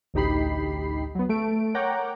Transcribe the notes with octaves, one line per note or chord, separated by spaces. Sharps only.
A1 D2 D#4 G4 B5 C7
F#3 B3
A3 D7
A#4 C#5 F#5 G5 A#5 D6